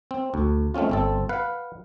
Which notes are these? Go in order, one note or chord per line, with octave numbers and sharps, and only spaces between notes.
C4
D2
G#3 A3 C4 C#4 F4
G1 C4 A4
B4 F5 F#5